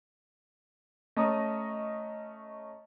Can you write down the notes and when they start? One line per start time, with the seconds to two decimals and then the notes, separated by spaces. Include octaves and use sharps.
1.17 A3 C#4 D#5 A#5 D#6